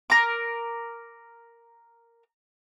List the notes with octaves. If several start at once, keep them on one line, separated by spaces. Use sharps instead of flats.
A#4 D6